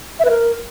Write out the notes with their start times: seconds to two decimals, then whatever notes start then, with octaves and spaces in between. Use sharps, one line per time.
0.20 E5
0.25 B4
0.30 A#4